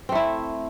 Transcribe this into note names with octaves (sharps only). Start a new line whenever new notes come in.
A3 C4 E4